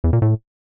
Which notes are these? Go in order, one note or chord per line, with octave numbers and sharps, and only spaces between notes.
E2
A#2
A2